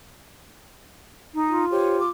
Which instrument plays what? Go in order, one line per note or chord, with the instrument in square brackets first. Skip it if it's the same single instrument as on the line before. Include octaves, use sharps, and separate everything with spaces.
[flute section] D#4
[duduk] F4
[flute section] G4 C5 C#5
D6